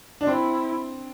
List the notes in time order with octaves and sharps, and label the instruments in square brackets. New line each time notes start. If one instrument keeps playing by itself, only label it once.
[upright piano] D4
[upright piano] C4 [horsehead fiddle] E4